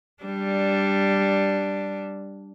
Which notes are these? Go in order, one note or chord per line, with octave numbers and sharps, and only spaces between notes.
G3 D4